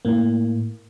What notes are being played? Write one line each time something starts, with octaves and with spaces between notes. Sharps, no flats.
A2 A#3